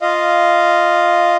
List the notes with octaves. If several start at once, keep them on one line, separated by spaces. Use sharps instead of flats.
F4 D#5 F5